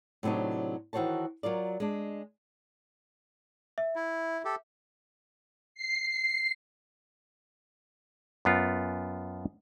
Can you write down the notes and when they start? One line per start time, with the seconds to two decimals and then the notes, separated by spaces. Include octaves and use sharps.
0.23 A2 C3 F#3 D4 D#4
0.93 D#3 E3 F#4 C5 C#5 A5
1.43 F#3 F4 A#4 D5
1.80 G#3 D4
3.78 E5
3.96 E4
4.45 G4 A4
5.74 C7
8.45 F#2 B3 F4